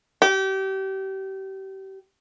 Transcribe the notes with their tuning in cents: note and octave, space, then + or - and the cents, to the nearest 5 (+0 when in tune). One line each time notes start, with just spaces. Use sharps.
G4 -30